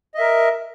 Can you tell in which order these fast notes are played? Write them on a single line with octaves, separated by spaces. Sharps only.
D#5 E5 A#4